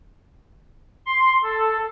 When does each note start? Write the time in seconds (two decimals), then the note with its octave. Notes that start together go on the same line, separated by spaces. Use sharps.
1.06 C6
1.43 A4